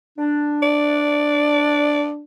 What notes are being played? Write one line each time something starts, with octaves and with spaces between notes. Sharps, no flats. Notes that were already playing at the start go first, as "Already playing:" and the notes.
D4
D5